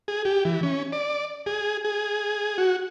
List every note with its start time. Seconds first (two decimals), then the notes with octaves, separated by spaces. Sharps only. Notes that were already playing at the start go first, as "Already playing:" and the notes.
0.08 G#4
0.25 G4
0.45 E3
0.63 C#4
0.92 D5
1.46 G#4
1.85 G#4
2.58 F#4